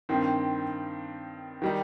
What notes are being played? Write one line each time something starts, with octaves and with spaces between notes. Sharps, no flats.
G2 D#3 C4
D#3 G3 D#4